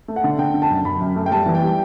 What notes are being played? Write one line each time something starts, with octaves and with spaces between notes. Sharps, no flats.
A3
F#5
D3
D3 G5
D3
A5
F#2
F#2 B5
F#2
A3
G5
G3 A5
E3
G5
G3